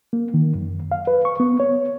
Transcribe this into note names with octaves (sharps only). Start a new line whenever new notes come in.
A#3
D#3
F#2
F5
B4
C#6
B3
C#5